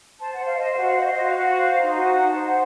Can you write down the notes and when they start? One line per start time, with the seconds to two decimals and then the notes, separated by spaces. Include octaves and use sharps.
0.18 C5 A5
0.32 F#5
0.38 C5
0.44 F5
0.57 C5 D#5
0.71 F5
0.78 F#4
0.85 F5
0.97 C5 D#5
1.04 F5
1.10 D#5
1.17 F#4
1.24 F5
1.36 F#4
1.56 C5
1.77 D#4
1.95 F#4
2.15 D#4 F#5
2.29 A5
2.35 C5
2.43 F#5